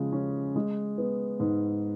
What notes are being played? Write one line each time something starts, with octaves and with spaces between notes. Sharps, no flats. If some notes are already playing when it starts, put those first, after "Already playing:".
Already playing: C#3 F3 G#3
C#4
G#3
B3
G#2